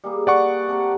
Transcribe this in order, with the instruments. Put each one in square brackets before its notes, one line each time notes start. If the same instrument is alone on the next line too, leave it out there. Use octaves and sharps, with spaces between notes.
[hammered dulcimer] G3 A#3 G#4
[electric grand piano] D5 F#5 C#6
[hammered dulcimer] C3 A4 A#4